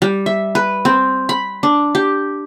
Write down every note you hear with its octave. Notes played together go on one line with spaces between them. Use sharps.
G3
E5
B4
C4
B5
D4
G4